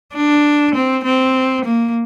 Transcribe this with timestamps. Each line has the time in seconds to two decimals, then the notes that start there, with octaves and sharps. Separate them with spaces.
0.15 D4
0.75 C4
1.04 C4
1.65 A#3